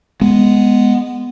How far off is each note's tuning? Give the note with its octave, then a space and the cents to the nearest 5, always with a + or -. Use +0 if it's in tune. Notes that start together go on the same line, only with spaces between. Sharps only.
G#3 +0 B3 +0